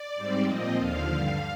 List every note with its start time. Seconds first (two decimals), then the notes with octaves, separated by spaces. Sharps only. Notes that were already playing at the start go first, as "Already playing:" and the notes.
Already playing: D5
0.15 G#2 G3 C4
0.46 A#2 F3 C4 D#5
0.77 D#2 D3 F3 F5
1.08 G2 D3 G3